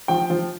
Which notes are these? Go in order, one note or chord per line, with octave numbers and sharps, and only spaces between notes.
F3 G5
F3